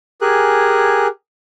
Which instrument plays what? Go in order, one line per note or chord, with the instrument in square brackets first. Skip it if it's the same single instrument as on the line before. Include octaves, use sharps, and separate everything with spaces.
[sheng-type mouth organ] G4 G#4 A#4 G#5 F#6